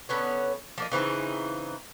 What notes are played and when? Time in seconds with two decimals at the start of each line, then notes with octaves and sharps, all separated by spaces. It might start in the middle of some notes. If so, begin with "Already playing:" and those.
0.09 D3 B3 C#4 C#5
0.78 F3 A#3 D#5
0.92 C#3 E3 C4 D#4